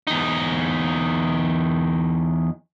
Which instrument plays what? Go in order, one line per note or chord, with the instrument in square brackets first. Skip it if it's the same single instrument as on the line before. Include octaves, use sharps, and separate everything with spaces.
[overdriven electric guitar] E2 D#4